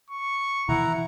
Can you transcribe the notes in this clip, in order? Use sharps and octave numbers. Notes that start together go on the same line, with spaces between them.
C#6
B2 D#3 E3 E4 F#5 A#5